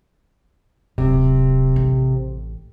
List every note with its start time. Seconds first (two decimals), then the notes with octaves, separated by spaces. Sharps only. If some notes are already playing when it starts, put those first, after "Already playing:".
0.98 D1 C3
1.76 A1